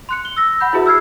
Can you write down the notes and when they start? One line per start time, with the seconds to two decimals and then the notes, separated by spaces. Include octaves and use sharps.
0.09 C6 F#6 C#7
0.25 G7
0.36 E6 A#6
0.61 F#5 B5 G6
0.73 E4 F#4 G#4 B4 E5
0.86 E6 F6 G#6 C7